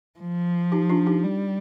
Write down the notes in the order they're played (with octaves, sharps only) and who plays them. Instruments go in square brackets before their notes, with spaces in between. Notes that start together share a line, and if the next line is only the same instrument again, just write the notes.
[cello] F3
[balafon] D#4 G4
D4 F4
D#4 G4
[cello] G3